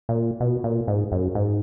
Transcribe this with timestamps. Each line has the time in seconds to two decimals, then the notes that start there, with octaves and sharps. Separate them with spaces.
0.09 A#2
0.40 B2
0.64 A#2
0.87 G#2
1.12 F#2
1.35 G#2